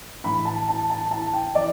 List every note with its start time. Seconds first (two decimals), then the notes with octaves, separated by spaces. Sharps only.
0.24 A2 E3 B5
0.45 A5
0.68 A5
0.90 A5
1.11 A5
1.33 G5
1.55 E3 D5